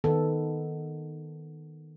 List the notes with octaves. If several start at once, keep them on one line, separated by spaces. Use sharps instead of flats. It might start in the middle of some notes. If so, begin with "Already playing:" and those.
D#3 B3 A4